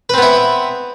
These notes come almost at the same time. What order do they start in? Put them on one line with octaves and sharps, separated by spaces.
B4 C4 B3 E4